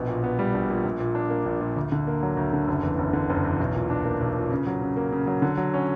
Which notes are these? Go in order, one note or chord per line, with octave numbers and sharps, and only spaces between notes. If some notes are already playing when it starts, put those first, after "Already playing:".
Already playing: A#1 B2
A#2
B3
G3
A#1
A#2
A#1
A#2
D4
A#3
A#1
A#2
D2
D3
A#3
F#3
D2
D3
F#1
E2
F#1
D3
F#1
E2
B1
A#2
D4
A#3
B1
A#2
C#3
F#3
C#3
A#3
C#3
F#3
D3
F#3
C#4